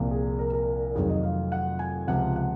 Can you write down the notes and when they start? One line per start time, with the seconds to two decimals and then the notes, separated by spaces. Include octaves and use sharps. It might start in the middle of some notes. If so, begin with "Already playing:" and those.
Already playing: C2 A#2 F3
0.11 G#4
0.39 A#4
0.53 A#4
0.95 F1 F2 D#3 F#3 G#4
1.09 D#5
1.23 F5
1.52 F#5
1.79 G#5
2.07 C#2 C3 F3 F#5
2.36 F#5